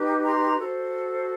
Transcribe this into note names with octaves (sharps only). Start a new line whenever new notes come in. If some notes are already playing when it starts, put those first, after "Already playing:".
Already playing: D#4 G4 B4
A#5 C6
F#4 A4 C5